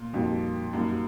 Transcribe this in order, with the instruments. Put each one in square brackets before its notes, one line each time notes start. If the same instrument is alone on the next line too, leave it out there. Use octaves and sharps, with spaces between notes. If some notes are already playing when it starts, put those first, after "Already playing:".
Already playing: [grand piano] A#2
[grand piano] F2 [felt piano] G3 A#3 D#4 F#4
[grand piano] F#2 [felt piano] G3 A#3 D#4 F#4